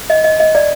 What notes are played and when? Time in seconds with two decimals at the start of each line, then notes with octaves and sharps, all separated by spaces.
0.10 D#5
0.24 D#5
0.40 D#5
0.55 D5